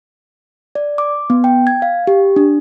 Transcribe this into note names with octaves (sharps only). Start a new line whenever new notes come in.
D5
D6
B3
G5
G#6
F5
G4
D4